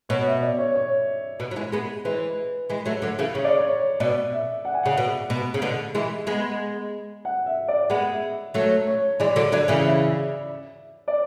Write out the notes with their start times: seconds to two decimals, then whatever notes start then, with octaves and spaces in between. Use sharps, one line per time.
0.09 B2 C#5
0.26 E5
0.42 D5
0.59 C#5
0.75 C#5
1.40 B2
1.51 F#3
1.56 E3 G#3
1.72 G#3 B3
2.05 E3 G#3 B4
2.70 E3 G#3
2.85 F#3 A3
3.02 D3 F#3
3.19 C#3 E3
3.35 C#3 C#5
3.44 D5
3.55 C#5
3.67 C#5
4.00 B2 D5
4.32 E5
4.65 F#5
4.74 G#5
4.83 C#3 F#5
4.98 B2
5.30 B2
5.54 C#3
5.62 B2 D3
5.95 E3 G#3
6.27 G#3 B3
7.25 F#5
7.46 E5
7.68 D5
7.90 G#3 B3 F#5
8.12 E5
8.54 F#3 A3 C#5
8.87 C#5
9.20 E3 G#3 D5
9.36 D3 F#3
9.52 D3 F#3 D5
9.68 C#3 E3
9.85 E5
11.08 D5